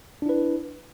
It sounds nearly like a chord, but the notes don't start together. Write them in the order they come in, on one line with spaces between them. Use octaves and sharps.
D4 E4 B4